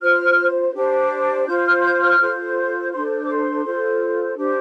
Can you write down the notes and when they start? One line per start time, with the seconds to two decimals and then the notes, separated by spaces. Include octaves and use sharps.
0.01 F4 C5 F6
0.74 D4 G4 C5
1.46 F4 C5 G6
1.65 F6
1.83 G6
2.01 F6
2.19 F4 A4 C5
2.91 D4 A4 C5 C6
3.24 D6
3.27 C6
3.64 F4 A4 C5
4.36 D4 G4 C5